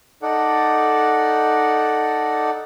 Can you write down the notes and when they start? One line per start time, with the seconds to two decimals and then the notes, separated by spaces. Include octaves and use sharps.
0.23 D#4 A4 D5 F#5